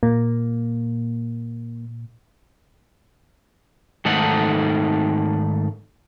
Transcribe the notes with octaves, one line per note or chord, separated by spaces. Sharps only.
A#2 A#3
G#2 D#3 A3 D#4 A4 F#5